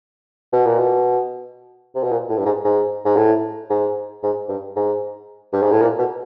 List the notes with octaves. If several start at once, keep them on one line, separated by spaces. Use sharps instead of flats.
B2
A#2
B2
C3
B2
A#2
A2
G2
G#2
G#2
G#2
A2
G#2
G#2
G2
G#2
G2
G#2
A2
A#2
B2